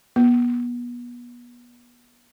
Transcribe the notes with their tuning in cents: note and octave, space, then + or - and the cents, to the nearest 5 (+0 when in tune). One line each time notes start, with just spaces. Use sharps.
B3 -30